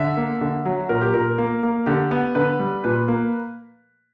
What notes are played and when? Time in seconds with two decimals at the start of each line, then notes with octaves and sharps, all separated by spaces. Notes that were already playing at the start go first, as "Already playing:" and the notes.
Already playing: D3 E5
0.17 A#3
0.41 D3
0.65 F#3
0.89 A#2 A#4
1.01 G4
1.14 A#2 A#4
1.38 A#3
1.63 A#3
1.86 D3 G4
2.11 B3
2.35 D3 B4
2.60 G3
2.84 A#2 B4
3.08 A#3